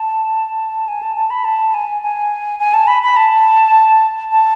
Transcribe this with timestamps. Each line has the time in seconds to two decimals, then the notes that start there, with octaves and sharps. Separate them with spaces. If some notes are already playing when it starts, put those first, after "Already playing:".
Already playing: A5
0.88 G#5
1.03 A5
1.16 A5
1.30 B5
1.44 A5
1.74 G#5
2.02 G#5
2.59 G#5
2.74 A5
2.87 B5
3.03 B5
3.17 A5
4.32 A5